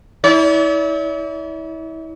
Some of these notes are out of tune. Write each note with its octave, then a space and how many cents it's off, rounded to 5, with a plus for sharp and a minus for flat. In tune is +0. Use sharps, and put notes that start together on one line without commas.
E4 -35 D5 -45